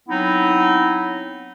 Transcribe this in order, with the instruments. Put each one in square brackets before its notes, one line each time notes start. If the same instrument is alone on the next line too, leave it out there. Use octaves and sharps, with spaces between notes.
[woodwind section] F#3 B3 C4 D#4 E4